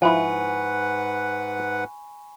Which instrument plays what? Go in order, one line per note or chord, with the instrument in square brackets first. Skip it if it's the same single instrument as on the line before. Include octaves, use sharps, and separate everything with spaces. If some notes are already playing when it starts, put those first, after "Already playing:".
[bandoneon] G#2 B4 F#5 [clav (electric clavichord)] F3 E4 [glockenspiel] G#5 B5 C#6